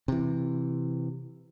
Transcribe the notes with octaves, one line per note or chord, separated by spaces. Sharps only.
C3 E3